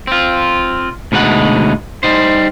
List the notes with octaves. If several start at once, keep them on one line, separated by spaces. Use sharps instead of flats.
C4 F4
D2 B2 G#3 D#4 F#5
G3 D#4 C5